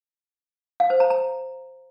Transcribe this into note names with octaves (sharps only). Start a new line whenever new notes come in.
F5
C5
A#5
A#5